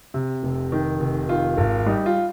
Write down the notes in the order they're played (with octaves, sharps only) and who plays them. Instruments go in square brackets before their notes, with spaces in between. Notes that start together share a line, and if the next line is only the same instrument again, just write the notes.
[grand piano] C3
F1
D#3
F1
D#3 F4
G#1
G3 D#4
F4